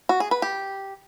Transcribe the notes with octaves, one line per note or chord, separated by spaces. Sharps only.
F#4
G#4
B4
G4